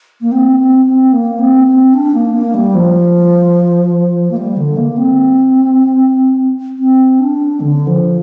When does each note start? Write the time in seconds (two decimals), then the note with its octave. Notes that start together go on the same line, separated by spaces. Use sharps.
0.21 A#3
0.32 C4
0.59 C4
0.85 C4
1.12 A#3
1.39 C4
1.66 C4
1.94 D4
2.14 A#3
2.34 A#3
2.54 G3
2.75 F3
4.31 A#3
4.37 G3
4.57 D3
4.77 A#3
4.97 C4
6.79 C4
7.20 D4
7.60 D3
7.87 F3